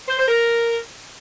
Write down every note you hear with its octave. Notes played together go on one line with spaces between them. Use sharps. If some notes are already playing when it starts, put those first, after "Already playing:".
C5
C5
A#4